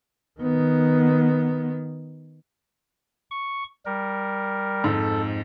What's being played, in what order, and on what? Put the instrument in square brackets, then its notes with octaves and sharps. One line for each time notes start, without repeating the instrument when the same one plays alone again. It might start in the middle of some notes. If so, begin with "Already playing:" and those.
[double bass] D#3 B3
[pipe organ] C#6
G3 A#4
[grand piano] F2 G#2 [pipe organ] A4